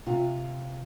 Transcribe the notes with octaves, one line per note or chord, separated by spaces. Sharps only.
C3 F4